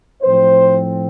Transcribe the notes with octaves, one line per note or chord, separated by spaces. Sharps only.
A2 F3 C4 C5